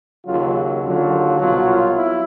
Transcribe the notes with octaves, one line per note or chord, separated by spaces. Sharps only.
D#2 C#3 F#3 F4
D#2 D3 F#3 F4
C2 B2 F#3 F4
F4
E4